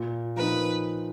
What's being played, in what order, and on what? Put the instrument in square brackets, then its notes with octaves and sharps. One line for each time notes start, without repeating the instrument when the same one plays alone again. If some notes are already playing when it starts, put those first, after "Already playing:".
Already playing: [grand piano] A#2
[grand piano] F3 A#3 D#4 [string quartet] B4